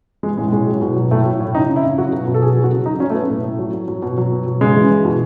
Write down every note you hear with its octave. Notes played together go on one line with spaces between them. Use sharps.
E3 G#3
A2 G#3
A2 G#3
F#3
B2
F#3
A2 A3
F#3
A2
C#3 D#4
C#3
E4
C#3
F#3 F#4
B2
B2
A4
F#3 G#4
F#3
F#4
C#3
F#3 D#4
F#3 C#4
A3
F#3 B3
A2 A3
A2
F#3
F#3
F#3
B2
F#3
B2
F#3
C#3 G#3
E3
E3
B2